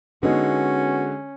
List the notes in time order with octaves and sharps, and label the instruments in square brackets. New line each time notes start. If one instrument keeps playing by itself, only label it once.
[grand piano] D3 G#3 [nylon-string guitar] B3 D#4 [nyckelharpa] C#4 [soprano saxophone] F#4